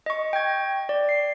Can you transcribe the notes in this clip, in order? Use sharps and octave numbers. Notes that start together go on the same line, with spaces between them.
D#5 C#6
G5 G#6
D5
C7